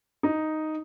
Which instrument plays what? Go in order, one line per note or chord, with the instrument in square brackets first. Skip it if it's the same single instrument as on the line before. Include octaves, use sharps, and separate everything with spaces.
[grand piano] D#4